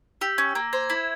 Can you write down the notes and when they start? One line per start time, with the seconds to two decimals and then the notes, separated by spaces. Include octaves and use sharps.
0.21 G4 E6
0.38 C#4
0.55 A#3
0.73 C5 G#6
0.90 E4